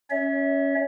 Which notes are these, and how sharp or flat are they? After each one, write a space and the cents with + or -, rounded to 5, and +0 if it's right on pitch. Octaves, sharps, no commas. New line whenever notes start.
C#4 +0 C#5 +25 E5 -25